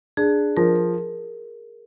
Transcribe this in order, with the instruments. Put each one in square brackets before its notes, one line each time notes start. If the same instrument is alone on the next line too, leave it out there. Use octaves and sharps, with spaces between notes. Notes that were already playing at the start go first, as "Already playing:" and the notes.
[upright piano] D4 [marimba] G#4
[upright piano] F3 [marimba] A#4